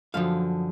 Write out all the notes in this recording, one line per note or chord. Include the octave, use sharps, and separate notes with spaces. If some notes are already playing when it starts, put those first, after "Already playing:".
F#2 D3 F3 F5